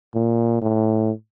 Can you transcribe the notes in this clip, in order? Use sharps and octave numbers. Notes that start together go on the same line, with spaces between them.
A#2
A2